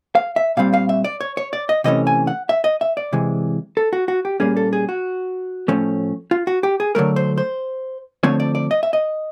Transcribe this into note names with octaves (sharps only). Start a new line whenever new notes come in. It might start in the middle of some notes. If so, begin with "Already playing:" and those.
F5
E5
A#2 G3 C4 F5
F5
E5
D5
C#5
C#5
D5
D#5
C3 E3 A3 C#4 D#5
G#5
F#5
E5
D#5
E5
D5
C3 E3 G#3
A4
F#4
F#4
G4
A#2 G3 A#3 C#4 G#4
A4
G#4
F#4
A2 F3 A3 C#4
F4
F#4
G4
G#4
D3 F#3 A3 A#4
C5
C5
D3 F3 A3 C4 C#5
D5
D5
D#5
E5
D#5